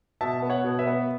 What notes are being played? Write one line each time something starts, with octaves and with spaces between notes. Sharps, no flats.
B2 E5 A5
B3
C#5 F#5
B2
B4 E5
B3